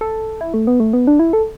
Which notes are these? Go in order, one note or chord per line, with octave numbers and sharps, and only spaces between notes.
A4
E4
A3
B3
A3
B3
D4
E4
A4